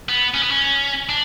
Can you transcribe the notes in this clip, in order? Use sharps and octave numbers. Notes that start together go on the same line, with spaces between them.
B3
C#4
B3
C#4
D4